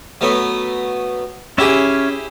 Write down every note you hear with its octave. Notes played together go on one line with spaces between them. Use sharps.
F#3 A3 B3
C#4 E4 G4 G#4 E5